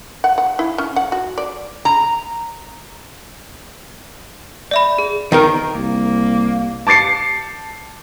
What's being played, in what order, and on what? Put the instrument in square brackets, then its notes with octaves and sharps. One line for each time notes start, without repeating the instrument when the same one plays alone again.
[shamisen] F#5
F#5
E4
C#4
F#5
F#4
D5
[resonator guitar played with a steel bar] A#5
[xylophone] D5 E5 B5
G#4
[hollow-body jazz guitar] D#3 D#4 A#4
[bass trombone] C2 [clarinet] A#3
[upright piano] A5 D6 A6 C7 C#7